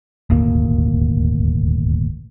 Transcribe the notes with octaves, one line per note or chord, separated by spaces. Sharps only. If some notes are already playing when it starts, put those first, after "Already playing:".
D#1 G#1 D2 A#3